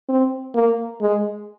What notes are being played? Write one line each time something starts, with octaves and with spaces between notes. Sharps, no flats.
C4
A#3
G#3